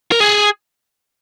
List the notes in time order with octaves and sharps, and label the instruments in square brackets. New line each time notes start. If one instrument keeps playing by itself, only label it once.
[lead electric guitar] A#4
G#4